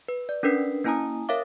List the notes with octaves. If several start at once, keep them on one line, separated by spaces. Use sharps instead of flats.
B4
D5
C#4 D4 A#4 B4 B6 C7
A#3 C#4 E4 G#5 A#5 D#6
A#4 C#5 E5 F5 D6